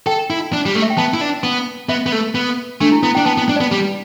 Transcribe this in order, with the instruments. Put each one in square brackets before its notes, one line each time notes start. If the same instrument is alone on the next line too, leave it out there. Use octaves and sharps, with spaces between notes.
[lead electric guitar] A4 [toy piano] G5
[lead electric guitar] E4
D4
G3
A3
[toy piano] E5
G5
[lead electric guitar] B3 [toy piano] A5
[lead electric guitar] E4
D4
B3
[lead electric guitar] B3 [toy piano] E5
[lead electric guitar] B3
A3
B3
[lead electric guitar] A3 [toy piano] D4
[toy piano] E4
[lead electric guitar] B3 [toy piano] E4
[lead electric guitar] D4 [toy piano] G5
[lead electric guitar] B3 [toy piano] A5
[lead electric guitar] B3
[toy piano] G5
[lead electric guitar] D4
[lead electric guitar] B3 [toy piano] D5
[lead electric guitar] G3